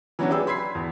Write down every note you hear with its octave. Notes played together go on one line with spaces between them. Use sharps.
E3 F#3 B3 C#4 D4 F#4
G4 G#4 B4 D5 G5 E6
B5 C6 G#6 B6 C7
E2